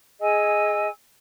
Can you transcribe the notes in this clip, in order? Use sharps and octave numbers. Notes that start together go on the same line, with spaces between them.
G#4 D#5 G#5 E6